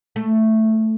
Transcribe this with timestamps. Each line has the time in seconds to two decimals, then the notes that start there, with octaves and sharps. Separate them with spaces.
0.16 A3